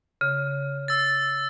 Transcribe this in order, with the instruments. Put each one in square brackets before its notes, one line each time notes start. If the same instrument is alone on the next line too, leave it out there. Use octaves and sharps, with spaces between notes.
[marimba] C#3
[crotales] E6 A6